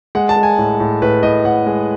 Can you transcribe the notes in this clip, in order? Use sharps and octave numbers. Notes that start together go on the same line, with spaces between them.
G#3 F#5
A5
G#3
G#5
A2
A2
A2 B4
A2 D#5
A2 F#5
G#3